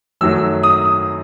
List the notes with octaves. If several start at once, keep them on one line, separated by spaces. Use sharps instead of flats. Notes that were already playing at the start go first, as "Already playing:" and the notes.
F#2 D#3 F#3 A3 E6
D#6
D#6